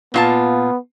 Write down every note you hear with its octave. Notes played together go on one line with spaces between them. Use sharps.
A#2 B3 F4 A5